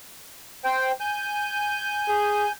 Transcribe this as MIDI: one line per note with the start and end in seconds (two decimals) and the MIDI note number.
0.64 0.92 72
0.64 0.92 79
1.00 2.52 80
1.00 2.52 91
2.08 2.46 68